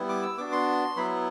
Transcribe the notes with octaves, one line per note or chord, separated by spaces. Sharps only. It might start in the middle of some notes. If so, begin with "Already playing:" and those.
Already playing: G3 B3 E4
D6
E6
B3 D4 F#4 D6
C6
F#3 B3 E4 B5